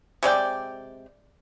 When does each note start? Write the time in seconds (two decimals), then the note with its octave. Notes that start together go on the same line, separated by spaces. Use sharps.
0.23 C3 G#3 D5 G5